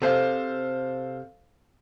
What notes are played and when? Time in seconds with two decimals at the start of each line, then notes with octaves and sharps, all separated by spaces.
0.02 C3 G#4 A4 C5 F5